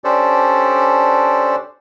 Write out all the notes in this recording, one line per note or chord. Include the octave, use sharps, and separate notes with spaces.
C#4 D4 G4 A4 C5 D5